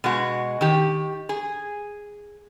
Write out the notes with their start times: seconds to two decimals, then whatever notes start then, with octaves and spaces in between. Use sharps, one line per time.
0.04 B2 G#3 F#4
0.61 D#3 G4
1.29 G#4